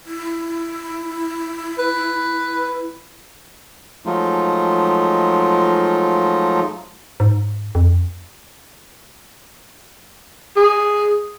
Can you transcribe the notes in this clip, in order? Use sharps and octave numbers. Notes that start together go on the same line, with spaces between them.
E4
B4
F3 F#3 G#3 A3 D#4 F4
G#2
F2
G#4